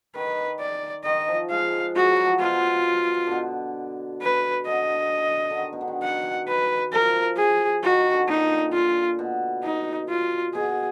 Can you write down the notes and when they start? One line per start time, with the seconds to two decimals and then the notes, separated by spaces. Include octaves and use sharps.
0.15 D#3 B4
0.60 D5
1.05 D#3 D#5
1.28 F3
1.50 G#3 F5
1.96 G#3 F#4
2.11 F#3
2.26 F3
2.40 B2 F4
3.27 B2 D3
4.22 B4
4.67 D3 D#5
5.50 D3
5.57 D#3
5.73 B2
5.81 D3
5.88 D#3
6.03 F#5
6.48 B4
6.93 F3 A#4
7.38 G#4
7.83 D#3 F#4
8.13 D3
8.28 A#2 D#4
8.73 F4
9.19 B2
9.63 D#4
10.09 F4
10.54 B2 G#4